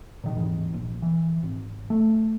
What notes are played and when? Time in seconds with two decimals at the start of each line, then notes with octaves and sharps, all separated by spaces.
0.24 A#2 D#3
0.35 G#1 D#2 G#2 E3
0.74 A#1
1.02 E3
1.43 G#1
1.90 A3